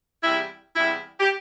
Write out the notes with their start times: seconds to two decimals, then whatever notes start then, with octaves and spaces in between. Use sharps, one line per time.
0.23 E2 C3 G3 E4
0.76 E2 C3 G3 E4
1.20 G4